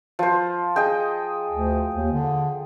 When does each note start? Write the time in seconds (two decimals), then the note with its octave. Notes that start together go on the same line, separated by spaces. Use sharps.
0.19 F3 C5
0.76 G#4 D#5 G5
1.50 D2
1.96 D#2
2.12 D3